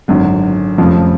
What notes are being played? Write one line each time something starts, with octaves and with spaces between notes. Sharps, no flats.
G#1 F#2 D3
F1 F2 C#3 F3